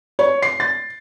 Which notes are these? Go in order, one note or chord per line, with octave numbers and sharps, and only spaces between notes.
C#5
C7
A6